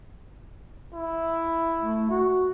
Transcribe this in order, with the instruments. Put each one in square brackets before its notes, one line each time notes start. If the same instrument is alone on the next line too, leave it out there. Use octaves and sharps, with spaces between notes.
[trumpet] E4
[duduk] A3
F#4